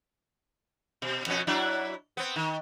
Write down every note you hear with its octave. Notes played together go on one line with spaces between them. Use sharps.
B2
F2 B2 C#4
F#3 D4 E4
B3 C4
D#3